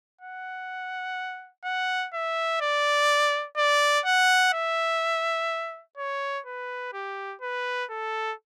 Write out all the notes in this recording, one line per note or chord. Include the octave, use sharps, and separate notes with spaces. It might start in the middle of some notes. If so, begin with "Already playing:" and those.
F#5
F#5
E5
D5
D5
F#5
E5
C#5
B4
G4
B4
A4